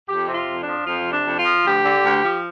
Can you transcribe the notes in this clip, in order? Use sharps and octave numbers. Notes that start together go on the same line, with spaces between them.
F2 G4
C3
F4
F2
D4
F3
F2 F4
C3
D4
F2
F4
F3
D2 G4
D3
D2
F3